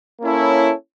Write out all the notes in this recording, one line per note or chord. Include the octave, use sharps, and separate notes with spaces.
A#3 C#4 E4 A4 C#5